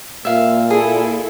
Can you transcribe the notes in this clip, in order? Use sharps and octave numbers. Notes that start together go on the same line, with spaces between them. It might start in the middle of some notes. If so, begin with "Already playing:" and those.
A#2 A#3 E5 F5
E4 G#4 A4